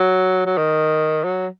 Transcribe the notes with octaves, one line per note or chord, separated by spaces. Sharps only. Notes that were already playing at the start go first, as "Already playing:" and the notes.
Already playing: F#3
F#3
D#3
F#3